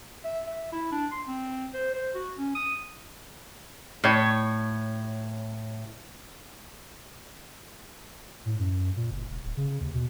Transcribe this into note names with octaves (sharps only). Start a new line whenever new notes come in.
E5
E5
E4
D4
C6
C4
C5
C5
F#4
C#4
D#6
A2 C#5
A2
F#2
A#2
F#1
E1
D1
C#3
D#2
B2